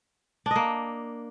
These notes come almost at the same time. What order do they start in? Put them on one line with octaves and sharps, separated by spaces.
D4 D#5 A#3